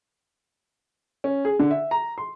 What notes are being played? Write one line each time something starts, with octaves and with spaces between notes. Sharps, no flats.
C#4
G#4
D3
E5
A#5
C6